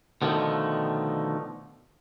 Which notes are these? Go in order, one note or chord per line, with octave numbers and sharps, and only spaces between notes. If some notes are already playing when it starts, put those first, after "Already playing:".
B2 D3 D#3 F3 A3